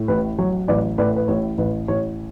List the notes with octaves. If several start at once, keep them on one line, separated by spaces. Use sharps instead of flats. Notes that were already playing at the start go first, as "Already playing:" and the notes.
Already playing: A2
A1 B4
F#3 C#5
A1 B4 D5
A2 B4 D5
B4
A1 C#5
A1 B4
A1 C#5